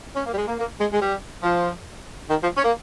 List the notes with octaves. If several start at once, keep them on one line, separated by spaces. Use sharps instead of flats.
C#4
A#3
G3
G#3
A#3
A#3
G#3
G#3
G3
F3
D#3
F3
C#4
A#3